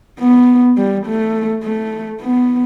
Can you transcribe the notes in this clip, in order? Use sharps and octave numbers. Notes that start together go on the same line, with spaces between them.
B3
G3
A3
A3
B3